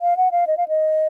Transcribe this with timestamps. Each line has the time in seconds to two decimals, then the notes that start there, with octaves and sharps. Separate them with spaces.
0.01 F5
0.17 F#5
0.31 F5
0.47 D#5
0.57 F5
0.68 D#5